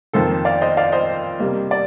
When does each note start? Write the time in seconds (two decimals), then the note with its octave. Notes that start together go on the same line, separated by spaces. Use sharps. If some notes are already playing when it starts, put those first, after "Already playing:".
0.13 F2 D#3 A#3 A4 C5
0.45 D5 F5
0.61 C5 D#5
0.77 D5 F5
0.92 C5 D#5
1.39 C3 G3 A#3
1.71 D5